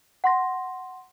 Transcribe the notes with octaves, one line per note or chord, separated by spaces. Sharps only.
F#5 C6 A#6